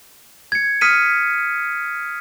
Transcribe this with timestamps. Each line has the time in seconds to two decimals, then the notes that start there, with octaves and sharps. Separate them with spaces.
0.52 G#6 C#7
0.81 D#6 F6 B6 C#7 D#7